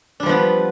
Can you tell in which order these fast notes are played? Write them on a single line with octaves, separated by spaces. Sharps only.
D4 G3 F3 B3